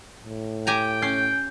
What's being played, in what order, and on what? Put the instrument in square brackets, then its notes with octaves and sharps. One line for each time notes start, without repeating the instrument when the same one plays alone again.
[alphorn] A2
[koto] G4 G#5 A#5 [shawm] G5
[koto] C#4 [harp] G6 C7